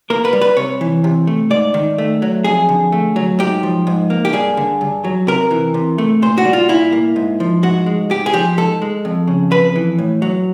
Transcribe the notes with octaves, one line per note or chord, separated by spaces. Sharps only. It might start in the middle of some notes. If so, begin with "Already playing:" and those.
A#3 A#4
B4
G3
B4
C3 C#5
E3
C3
A3
G#2 D5
D#3
A3
F#3
F2 G#4
D3
A3
F#3
G#2 G4
F3
G#2
A#3
G4
G2 G#4
D3
G2
F#3
C3 A#4
E3
C3
A3
A#2 C5
F#4
G3
F4
A#2 E4
A#3
G#2
F3
G#2 F#4
G#3
G#2 G4
G#4
F3 G4
G#2 A4
G#3
F2
C#3
F2 B4
E3
A2
F#3